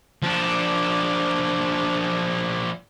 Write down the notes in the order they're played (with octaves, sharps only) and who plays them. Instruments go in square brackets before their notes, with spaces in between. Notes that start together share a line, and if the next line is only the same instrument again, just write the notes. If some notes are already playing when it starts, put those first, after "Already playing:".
[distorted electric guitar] F3 D4